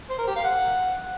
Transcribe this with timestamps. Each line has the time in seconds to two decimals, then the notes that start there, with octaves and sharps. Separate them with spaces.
0.10 C5
0.19 A#4
0.27 G4
0.36 F5
0.44 F#5